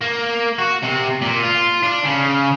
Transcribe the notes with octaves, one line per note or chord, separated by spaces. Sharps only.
A#3
F#4
C3
A#2
F4
D4
C#3